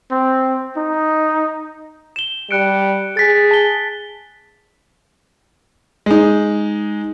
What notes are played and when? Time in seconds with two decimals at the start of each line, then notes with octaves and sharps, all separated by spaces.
0.11 C4
0.77 D#4
2.16 E7 G7
2.51 G3 F#6 C#7 D7
3.17 G#4 A6 B6
3.51 A5 G7
6.06 G#3 D#4